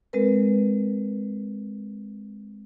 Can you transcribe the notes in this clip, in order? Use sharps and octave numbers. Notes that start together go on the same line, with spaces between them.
G#3 C4 A#4 B4